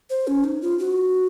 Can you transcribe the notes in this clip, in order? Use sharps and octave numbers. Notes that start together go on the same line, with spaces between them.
C5
C#4
D#4
F4
F#4